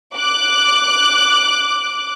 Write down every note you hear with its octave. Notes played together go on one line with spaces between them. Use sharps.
D6 F#6